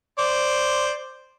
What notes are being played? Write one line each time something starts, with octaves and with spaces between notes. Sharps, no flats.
C5 D5